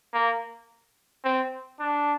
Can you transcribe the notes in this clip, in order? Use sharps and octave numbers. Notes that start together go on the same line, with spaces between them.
A#3
C4
D4